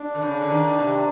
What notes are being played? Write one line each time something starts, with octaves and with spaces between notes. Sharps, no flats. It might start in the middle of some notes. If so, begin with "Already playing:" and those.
Already playing: D4
D3
C#3
D3
D#3
C3